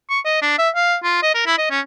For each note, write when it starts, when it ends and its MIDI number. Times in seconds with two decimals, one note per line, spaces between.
0.10 0.19 85
0.25 0.40 75
0.42 0.58 62
0.58 0.69 76
0.76 0.96 77
1.04 1.20 65
1.23 1.34 75
1.34 1.46 70
1.47 1.58 64
1.58 1.67 75
1.70 1.80 61